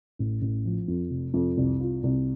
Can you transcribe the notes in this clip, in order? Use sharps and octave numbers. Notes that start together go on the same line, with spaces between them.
A1
A1
F3
F2
F1
F2
C2
F4
C2